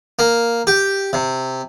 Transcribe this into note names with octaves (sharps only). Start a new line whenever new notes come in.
A#3
G4
C3